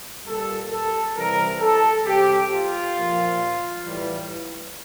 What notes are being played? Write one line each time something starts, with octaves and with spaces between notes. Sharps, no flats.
A#2 G3 A4
A4
C3 E3 G3 A#4
A4
C3 G3 G4
F4
A#2 F3
A2 E3 G3